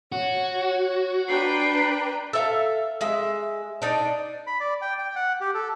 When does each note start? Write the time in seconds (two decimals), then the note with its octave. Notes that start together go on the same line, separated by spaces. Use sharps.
0.12 F#4 C#5
1.29 D4 B4 G5 A#5 C7
2.33 A4 E5 F5
3.01 G#3 E5
3.82 D4 D#4 D5
4.47 B5
4.60 D5
4.82 G5
4.99 G5
5.16 F#5
5.41 G4
5.54 A4